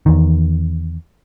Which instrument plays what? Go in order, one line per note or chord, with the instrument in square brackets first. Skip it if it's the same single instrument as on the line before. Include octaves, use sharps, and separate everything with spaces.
[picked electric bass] E2 D#3